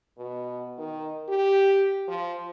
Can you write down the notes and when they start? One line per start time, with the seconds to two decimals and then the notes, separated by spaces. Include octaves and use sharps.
0.18 B2
0.78 D#3
1.28 G4
2.08 F3